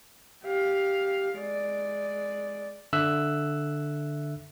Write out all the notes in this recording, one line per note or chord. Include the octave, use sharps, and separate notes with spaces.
G4 F5
G#3 D5
D3 E5 E6 F#6